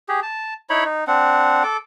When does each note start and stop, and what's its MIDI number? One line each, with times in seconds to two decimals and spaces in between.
0.09 0.20 67
0.09 0.20 68
0.23 0.54 81
0.70 0.84 63
0.70 0.84 64
0.70 0.84 73
0.70 0.84 83
0.84 1.04 63
1.07 1.63 60
1.07 1.63 62
1.07 1.63 78
1.63 1.77 69
1.63 1.77 86